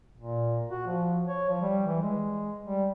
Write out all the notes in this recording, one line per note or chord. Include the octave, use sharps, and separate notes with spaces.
A#2
F#4
F3
C#5
F3
G3
E3
G#3
G3